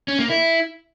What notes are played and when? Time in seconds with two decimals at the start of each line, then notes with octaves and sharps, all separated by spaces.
0.08 C#4
0.19 A#3
0.30 E4